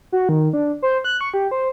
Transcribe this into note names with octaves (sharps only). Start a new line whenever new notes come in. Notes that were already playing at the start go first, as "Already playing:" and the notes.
F#4
D#3
D4
C5
F#6
C#6
G4
C5